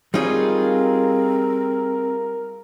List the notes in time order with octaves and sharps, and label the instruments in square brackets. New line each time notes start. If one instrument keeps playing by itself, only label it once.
[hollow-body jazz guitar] G3 D#4 C#5 [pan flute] C4 [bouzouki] F4 G#4 [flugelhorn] A#4